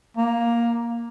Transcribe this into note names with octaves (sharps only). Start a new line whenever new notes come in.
A#3